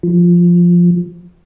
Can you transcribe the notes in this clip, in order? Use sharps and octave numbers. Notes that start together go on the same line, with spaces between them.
F3